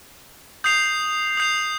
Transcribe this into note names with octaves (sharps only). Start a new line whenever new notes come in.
D#6 G6 C7 F7
D#6 G6 C7 F7